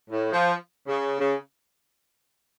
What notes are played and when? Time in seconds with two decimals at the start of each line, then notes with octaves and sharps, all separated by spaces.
0.10 A2
0.32 F3
0.87 C#3
1.19 C#3